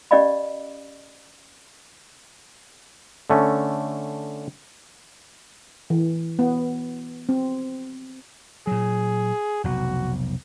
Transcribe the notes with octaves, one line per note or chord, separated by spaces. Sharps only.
C#4 G4 D5 D#5 F5 B5
D3 A3 C#4
E3
B3
C4
A#2 F#3 G#4
F1 B1 F#4